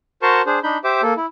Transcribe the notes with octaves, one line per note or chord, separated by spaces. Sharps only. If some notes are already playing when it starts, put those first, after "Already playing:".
F#4 A#4 C5 A5 C6 C#6
D4 G#4 C5
D4 D#4 B5 G6
G4 C5 E5 D6
A#3 A4
E4